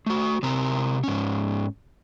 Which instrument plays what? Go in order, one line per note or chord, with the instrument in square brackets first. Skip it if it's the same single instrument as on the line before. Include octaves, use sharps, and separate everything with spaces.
[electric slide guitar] A3 F#4
C3 C4 A#4 A#5
G#2 C#4